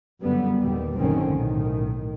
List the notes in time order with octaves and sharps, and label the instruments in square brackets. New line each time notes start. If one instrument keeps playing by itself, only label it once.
[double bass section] F#2 D3 G3 B3
D#2 A#2 G3
A#1 F#2 D3 D#3 C4 C#4
B1 A2 D#3